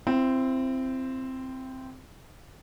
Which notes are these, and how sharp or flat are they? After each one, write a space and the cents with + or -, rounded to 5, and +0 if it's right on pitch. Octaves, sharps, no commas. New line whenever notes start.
C4 +0 E4 +35